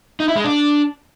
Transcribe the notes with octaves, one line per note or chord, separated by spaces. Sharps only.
D#4
E4
G#3
D4